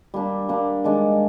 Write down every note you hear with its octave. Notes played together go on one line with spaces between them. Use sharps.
G3 A#3 D4
G3 A#3 D4
D#3 G#3 D4